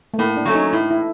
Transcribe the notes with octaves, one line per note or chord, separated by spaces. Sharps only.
A3
A2 A#3
D4
F#3 A3 C#4
D#4
A2 E4
E4